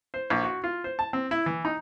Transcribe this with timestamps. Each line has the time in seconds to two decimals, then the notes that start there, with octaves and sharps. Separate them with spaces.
0.14 C5
0.30 A#1
0.43 F#4
0.64 F4
0.84 C5
0.99 A5
1.13 C4
1.31 E4
1.46 E3
1.65 D#4